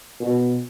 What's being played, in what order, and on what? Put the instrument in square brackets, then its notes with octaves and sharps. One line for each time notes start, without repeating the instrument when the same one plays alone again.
[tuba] B2